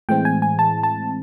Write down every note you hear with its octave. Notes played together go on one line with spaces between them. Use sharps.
A2 E3 G#3 C4 G5
G#5
G#5
A5
A5